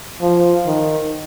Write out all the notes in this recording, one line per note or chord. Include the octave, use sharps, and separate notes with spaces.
F3
D#3